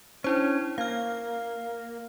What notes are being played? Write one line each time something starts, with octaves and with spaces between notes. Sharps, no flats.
C#4 D4 E4 C5
A#3 F5 F6